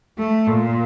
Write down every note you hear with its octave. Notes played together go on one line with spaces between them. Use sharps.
A3
A#2